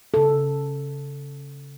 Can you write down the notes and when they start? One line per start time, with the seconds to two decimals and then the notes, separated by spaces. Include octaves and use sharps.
0.14 C#3 A4